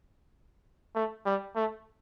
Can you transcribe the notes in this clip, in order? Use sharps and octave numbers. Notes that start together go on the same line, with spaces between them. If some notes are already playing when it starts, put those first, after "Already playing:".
A3
G3
A3